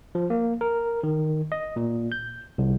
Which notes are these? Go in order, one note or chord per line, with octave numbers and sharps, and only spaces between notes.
F3
A#3
A#4
D#3
D#5
A#2
G6
C2